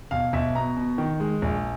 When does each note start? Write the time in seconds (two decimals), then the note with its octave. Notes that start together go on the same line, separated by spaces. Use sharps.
0.11 B1 F5
0.33 B1 E5
0.55 B2 A#5
0.77 B2
0.98 D#3
1.20 G#3
1.42 A#1